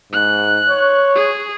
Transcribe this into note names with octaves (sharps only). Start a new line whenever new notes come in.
G#2 F#6
C#5
G#4